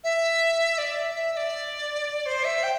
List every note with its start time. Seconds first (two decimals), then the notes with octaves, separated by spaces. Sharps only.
0.04 E5
0.78 D5
0.96 E5
1.15 E5
1.33 E5
1.37 D5
2.26 C5
2.44 E5
2.63 G5